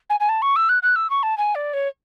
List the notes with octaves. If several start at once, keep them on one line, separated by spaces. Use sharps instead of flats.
G#5
G#5
A5
C#6
E6
F#6
F#6
E6
C#6
A5
G#5
D5
C#5